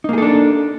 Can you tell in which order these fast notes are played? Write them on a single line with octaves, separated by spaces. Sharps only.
D#4 A#3 G#4 A4 D4